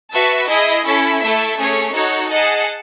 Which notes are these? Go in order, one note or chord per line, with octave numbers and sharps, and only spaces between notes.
F#4 B4 E5 A5
E4 G#4 D#5
C#4 E4 A4
A3 E4 A4 E5
A3 C#4 G#4 C#5
D#4 F#4 A4 C#5 F#5
G#4 D#5 F#5 A5